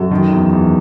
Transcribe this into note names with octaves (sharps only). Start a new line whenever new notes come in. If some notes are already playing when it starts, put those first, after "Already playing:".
Already playing: F#2 F#4 A4
D#3
E2
E2